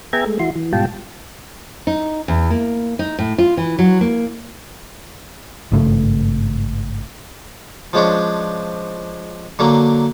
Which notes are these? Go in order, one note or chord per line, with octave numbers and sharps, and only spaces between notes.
B3 G#4 E5 G5 A#5 G#6
G#3 A3
E3 E4 F#4 C6
E3
G#2 B2 G3 F4 G5 A5
D#4
E2
A#3
D#4
A2
F4
E3
F#3
A#3
G#1 G2 C#3 A3
F3 G#3 C#4 D4
D3 F#3 A#3